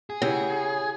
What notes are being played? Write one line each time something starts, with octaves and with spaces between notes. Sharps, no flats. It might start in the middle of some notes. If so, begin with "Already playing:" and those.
G#4
C#3 E4 G4 F#5